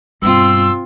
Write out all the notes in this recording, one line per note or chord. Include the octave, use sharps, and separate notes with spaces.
G2 B2 C4 F4 E6